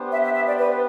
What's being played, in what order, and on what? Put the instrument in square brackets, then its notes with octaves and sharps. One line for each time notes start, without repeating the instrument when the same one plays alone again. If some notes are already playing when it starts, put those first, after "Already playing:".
Already playing: [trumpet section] B3 D4 G4 C5
[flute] E5
E5
E5
D5
B4